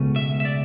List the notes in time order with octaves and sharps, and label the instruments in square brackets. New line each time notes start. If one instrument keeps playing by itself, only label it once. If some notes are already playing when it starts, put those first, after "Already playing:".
Already playing: [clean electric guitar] C#2 B2 A3 C#4
E5
E5
D5